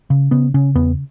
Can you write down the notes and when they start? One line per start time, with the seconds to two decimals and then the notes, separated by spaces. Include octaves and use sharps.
0.10 C#3
0.31 C#3 B3
0.54 C#3 C#4
0.75 E2 B3